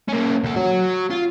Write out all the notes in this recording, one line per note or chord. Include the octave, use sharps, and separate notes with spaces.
A#3 C#4
D2 A4
F#4 C#5
F4